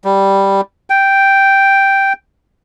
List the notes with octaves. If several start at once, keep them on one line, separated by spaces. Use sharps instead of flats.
G3
G5